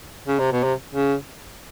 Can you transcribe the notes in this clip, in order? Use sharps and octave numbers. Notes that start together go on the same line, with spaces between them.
C#3
C3
B2
C3
C#3